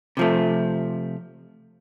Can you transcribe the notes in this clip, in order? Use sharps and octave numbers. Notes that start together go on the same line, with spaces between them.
C3 F3 A3